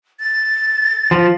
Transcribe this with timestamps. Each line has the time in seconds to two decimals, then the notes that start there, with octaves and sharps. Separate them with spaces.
0.20 A6
1.11 F3